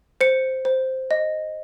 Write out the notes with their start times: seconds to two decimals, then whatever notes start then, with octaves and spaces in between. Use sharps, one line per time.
0.21 C5 C#7
0.65 C5
1.11 D#5